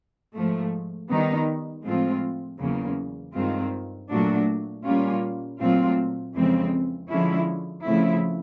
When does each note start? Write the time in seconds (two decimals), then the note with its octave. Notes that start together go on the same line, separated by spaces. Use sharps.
0.34 G#2 F3 A3
1.10 D#3 G3 B3 D#4
1.85 A2 F3 G#3 C4 F4
2.60 E2 C#3 F#3 A#3
3.34 G2 D#3 G#3 C4 F4
4.10 A#2 F#3 A3 D4 F#4
4.85 A#2 G3 A#3 C#4 F4
5.60 A#2 F#3 A3 C4 F4
6.35 F2 C#3 E3 G#3 C4
7.10 D3 F3 G#3 C#4 E4
7.85 C#3 F3 A3 C4 E4